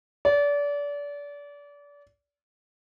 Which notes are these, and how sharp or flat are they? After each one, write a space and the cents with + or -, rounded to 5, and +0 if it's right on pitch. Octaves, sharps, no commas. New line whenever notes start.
D5 -30